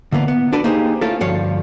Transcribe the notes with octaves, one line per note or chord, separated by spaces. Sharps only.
D3 E3 A#3 B3
B3
D4 F#4 A4 B4 D5
A#3 D#4 G4 G#4 C5
A3 A#3 C#4 E4 F4 A4
D2 G2 F3 C#5 F5